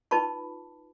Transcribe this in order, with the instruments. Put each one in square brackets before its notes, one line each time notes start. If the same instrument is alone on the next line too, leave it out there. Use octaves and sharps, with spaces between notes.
[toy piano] D#4 F4 B4 A5 B5 C#6